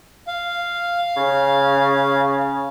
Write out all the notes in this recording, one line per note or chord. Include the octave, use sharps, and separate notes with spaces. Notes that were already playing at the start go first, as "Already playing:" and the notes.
F5
C#3